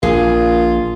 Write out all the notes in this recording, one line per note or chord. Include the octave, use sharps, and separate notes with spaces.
A#1 F4 G#4 A#4